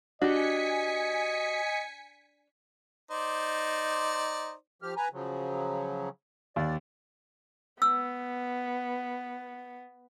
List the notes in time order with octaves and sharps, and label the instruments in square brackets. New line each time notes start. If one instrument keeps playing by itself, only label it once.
[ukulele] D4 [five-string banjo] F#4 G4 [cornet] D#5 [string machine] G#5 B6 C#7
[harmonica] D#4 C5 D5
[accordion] F3 G4 F6
B4 G#5 A#5
C#3 F3 F#3
[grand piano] D#2 [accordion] D5
[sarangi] B3 [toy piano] E6